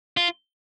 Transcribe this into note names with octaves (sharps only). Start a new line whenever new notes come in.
F4